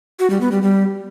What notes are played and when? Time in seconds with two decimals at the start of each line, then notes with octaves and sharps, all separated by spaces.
0.19 F#4
0.30 G3
0.41 B3
0.52 G3
0.62 G3